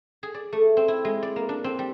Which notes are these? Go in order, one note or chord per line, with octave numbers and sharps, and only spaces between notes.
G#4
D5
A3
C4
E4
G#3
D5
A#3
D4
C4
G3